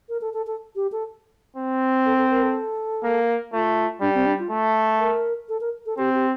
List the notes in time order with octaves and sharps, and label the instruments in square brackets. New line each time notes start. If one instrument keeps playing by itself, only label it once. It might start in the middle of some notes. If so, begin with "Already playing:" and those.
[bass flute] A#4
A4
A4
A4
G4
A4
[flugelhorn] C4
[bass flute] A4
A4
A#4
A4
[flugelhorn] A#3
[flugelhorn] A3 [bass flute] F4
[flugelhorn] G3 [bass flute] D4
[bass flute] C4
D4
F4
[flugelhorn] A3
[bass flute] A#4
A4
A#4
A4
[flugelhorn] C4 [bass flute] G4
[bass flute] G4